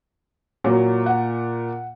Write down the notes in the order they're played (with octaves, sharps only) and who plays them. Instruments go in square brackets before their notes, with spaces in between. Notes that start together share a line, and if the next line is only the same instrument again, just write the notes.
[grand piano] A#2 [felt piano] F#3
[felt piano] F#5